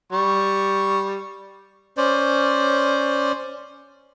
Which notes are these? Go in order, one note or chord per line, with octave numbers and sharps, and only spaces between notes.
G3 C#6
C#4 C5 D5